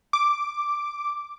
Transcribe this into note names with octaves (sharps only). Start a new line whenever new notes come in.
D6